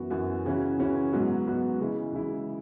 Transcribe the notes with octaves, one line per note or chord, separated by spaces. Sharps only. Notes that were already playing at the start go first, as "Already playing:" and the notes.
Already playing: F#2 E3 B3 F#4
F#2 E3 B3 F#4
C#3 E3 C#4 F#4
C#3 E3 C#4 F#4
G#2 F#3 B3 F#4
G#2 F#3 B3 F#4
C#3 E3 G#3 E4
C#3 E3 G#3 E4